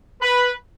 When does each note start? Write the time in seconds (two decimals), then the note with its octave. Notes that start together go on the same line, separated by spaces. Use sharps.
0.22 B4